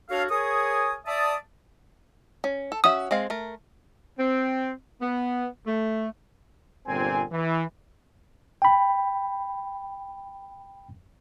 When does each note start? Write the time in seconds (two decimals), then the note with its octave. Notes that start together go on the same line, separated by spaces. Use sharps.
0.10 D4 F#4 A4 C#5 F5
0.29 G#4 A#4 C#5 G#5 C#6 D#6
1.06 D5 E5 A5 D#6
2.44 C#4
2.72 A4
2.84 C#4 F#4 E5 D#6
3.11 G#3 C4 F5
3.30 A3 A#4
4.19 C4
5.02 B3
5.66 A3
6.87 G1 A#2 C4 G#5
7.32 E3
8.62 G5 B5